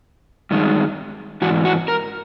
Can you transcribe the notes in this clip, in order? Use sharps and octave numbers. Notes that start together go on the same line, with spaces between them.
G2 D#3 G#3
G#2 E3 F#4
F#4
A#4